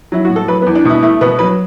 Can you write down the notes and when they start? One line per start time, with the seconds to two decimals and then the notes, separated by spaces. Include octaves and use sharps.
0.12 F#3 E4
0.25 A2 F#4
0.36 A4
0.48 F#3 B4
0.62 B3
0.66 E2
0.75 D4
0.85 B2 E4
1.03 A3 E4
1.21 B2 B3
1.39 F#3 B4